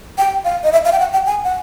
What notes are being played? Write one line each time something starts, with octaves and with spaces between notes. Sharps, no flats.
G5
F5
D#5
E5
F5
G5
F#5
G5
G#5
F#5